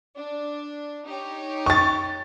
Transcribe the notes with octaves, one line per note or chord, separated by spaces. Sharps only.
D4
D#4 G4 C#5
C#6 A6